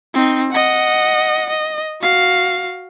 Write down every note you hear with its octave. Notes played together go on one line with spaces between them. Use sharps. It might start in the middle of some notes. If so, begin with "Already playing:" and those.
C4 D#4
D#5 F#5
D#5
F#4 F5